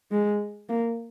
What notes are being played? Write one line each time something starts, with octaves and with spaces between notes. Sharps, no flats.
G#3
A#3